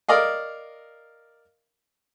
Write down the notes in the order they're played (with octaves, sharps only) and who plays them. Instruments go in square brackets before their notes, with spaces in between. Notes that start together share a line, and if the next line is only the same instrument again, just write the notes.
[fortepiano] A#4 D5 D#5 F5